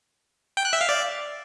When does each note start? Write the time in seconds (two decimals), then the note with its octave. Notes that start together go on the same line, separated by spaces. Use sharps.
0.57 G5
0.65 F#6
0.73 E5
0.81 F5
0.89 D5